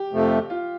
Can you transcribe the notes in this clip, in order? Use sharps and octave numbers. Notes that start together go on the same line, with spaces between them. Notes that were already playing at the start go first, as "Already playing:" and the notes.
Already playing: G4
F2 C3 F3 A3
F4